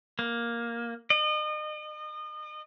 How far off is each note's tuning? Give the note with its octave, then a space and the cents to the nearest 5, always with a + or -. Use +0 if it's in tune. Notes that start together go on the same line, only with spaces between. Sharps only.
A#3 +5
D#5 -35